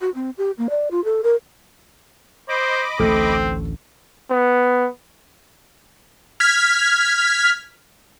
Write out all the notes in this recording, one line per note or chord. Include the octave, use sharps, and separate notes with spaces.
F#4
C4
G4
A#3
D5
F4
A4
A#4
C5 D#5 B5 D6
A1 D2 A2 A3 C4
B3
F6 G#6 B6